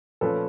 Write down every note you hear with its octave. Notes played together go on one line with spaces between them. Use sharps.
A#2 F3 A3 C#4 A4 B4